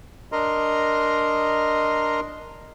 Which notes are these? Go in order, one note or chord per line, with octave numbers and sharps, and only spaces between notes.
D4 A#4 D#5 A#5 C6